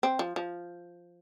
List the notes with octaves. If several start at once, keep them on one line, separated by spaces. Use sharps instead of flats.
C4
F3
F3